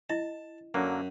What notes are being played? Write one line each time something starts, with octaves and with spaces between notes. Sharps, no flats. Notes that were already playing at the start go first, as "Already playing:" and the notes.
E4 D#5 A5
F#2 D3 F#3 A#3